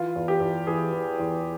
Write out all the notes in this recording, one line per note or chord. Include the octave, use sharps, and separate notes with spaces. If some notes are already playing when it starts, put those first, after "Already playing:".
Already playing: E3 F4
E2
G4
E2
E3 G#4
E3
E2